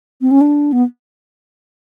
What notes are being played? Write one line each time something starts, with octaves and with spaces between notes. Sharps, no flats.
C4
C#4
D4
B3